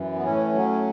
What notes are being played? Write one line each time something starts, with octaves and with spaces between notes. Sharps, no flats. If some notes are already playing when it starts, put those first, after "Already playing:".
Already playing: F#2 E3
B3
A2 C#4
F#3